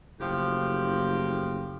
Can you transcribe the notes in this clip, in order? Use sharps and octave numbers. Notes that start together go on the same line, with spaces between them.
F#1 A2 F3 G4